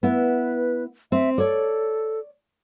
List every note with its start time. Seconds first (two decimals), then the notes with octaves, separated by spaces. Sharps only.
0.03 B3 E4 B4
1.12 C4 E5
1.38 A4 C#5 D5